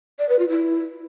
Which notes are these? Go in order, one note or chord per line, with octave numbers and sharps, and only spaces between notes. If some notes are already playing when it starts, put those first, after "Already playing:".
D5
B4
F4
E4